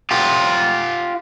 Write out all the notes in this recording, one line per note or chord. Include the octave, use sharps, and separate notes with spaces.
F4 G4